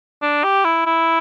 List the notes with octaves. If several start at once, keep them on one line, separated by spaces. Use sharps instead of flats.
D4
G4
E4
E4